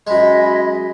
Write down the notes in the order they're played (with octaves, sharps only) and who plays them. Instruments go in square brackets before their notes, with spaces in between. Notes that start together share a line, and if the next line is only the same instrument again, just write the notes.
[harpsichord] F#2 G#3 [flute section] G#4 D#5 B5